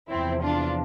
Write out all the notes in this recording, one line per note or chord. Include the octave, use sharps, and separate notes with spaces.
E2 C3 F3 C4 E4
D4 F4